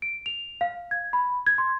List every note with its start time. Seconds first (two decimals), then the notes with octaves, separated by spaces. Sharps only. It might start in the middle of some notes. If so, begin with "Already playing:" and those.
0.02 D7
0.26 F7
0.61 F5
0.91 G#6
1.13 B5
1.46 G#6
1.58 C6